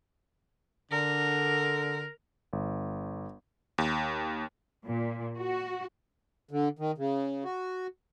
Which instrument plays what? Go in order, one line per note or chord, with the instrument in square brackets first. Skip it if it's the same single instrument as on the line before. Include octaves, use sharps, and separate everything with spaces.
[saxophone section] D3 [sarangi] A#4
[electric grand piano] G1
D#2
[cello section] A#2
F#4
[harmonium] D3
D#3
C#3
F#4